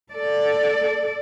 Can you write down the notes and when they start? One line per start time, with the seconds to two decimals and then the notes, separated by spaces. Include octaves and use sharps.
0.12 A4 D5